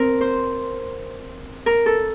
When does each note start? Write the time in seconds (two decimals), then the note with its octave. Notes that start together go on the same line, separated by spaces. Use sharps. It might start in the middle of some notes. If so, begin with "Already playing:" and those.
Already playing: C4 A#4
0.21 C5
1.66 A#4
1.86 A4